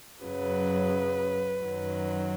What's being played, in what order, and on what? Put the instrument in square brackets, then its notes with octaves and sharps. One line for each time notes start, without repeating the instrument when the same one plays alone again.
[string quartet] F#2 C#3 F#3 B4
F#2 D#3 F#3